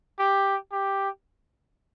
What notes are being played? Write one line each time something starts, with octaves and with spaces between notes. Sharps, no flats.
G4
G4